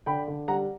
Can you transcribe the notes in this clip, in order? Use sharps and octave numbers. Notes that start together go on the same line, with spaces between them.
D3 G5 B5
D3
G3 F#5 A#5